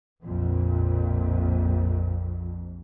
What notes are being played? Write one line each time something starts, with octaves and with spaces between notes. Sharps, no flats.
A#1 F2 A#2